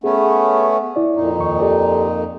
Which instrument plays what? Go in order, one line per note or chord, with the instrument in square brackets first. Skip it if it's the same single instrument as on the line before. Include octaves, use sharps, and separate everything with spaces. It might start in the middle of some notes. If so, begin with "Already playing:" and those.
[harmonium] A3 B3 C#4 [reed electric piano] G#4
[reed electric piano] E4 D5
[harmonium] F2 A#2 D#4
[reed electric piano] D#2 C#6
G4 A4 D5